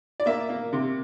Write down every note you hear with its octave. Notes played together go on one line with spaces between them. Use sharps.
D5
A#3 E5
A#3
C3